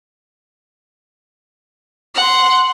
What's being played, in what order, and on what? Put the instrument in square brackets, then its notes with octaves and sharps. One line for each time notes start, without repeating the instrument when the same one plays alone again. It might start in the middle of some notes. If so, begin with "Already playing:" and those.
[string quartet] F#5 C6